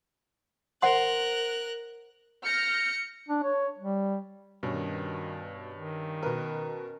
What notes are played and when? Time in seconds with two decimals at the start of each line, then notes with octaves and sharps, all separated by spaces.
0.82 A#4 C5 F#5 C6 F#6
2.44 F6 G6 A#6 C#7
3.28 D4
3.44 C#5
3.78 G3
4.63 G2 B2 D#3 C#4
5.74 D#3
6.23 B2 A#4 B4